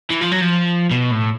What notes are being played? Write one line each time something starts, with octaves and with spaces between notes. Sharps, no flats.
E3
F3
F#3
F3
B2
A2